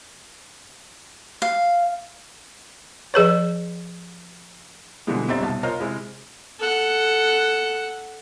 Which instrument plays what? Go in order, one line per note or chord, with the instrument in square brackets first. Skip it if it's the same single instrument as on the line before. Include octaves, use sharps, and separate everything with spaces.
[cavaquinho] F5
[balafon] F3 G#4 B4 C#5
[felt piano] B2 D3 E3 F3 G3 G#3
G1 G3 C4 D#4 E5 A6
C2 B2 A5
F4 A#4 C5 C#5 D#5 F6
C3 G#3 E4
[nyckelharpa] A4 F#5